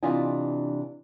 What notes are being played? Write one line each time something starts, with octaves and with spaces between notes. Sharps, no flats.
C3 E3 D4 F4 D#5 G#5